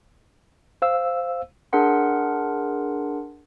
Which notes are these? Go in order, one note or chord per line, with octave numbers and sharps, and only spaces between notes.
C5 F5 E6
D4 G#4 A#4 F#5 C6